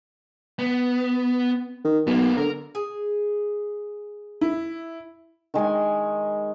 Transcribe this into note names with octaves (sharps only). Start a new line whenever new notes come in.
B3
D#3
B1 A#3 B3
D3 A#4
G#4
E4
D#3 G#3 D#5 G#5